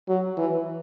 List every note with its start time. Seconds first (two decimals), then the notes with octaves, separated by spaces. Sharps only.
0.08 F#3
0.37 E3